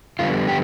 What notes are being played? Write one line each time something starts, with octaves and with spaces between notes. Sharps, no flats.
F2 D3 G3 B3 F4
G4